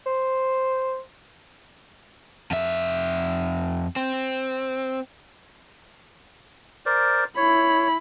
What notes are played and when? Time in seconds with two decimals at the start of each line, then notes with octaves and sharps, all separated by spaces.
0.06 C5
2.51 F2 E5
3.96 C4
6.86 A#4 C5 D5
7.37 E4 C#5 B5